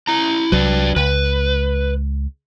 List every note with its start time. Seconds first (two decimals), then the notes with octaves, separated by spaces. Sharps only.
0.08 E4 A#5
0.52 C2 F#3 D4 B4
0.96 C#2 B4